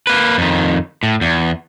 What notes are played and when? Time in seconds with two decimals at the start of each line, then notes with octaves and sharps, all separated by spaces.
0.07 A#3 B4
0.38 F2 D#3
1.03 A2
1.21 E2